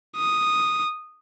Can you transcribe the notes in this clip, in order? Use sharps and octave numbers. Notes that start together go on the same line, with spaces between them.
D#6